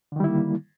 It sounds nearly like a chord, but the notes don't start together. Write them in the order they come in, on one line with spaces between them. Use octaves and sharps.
D3 D#3 G3 E4 A#3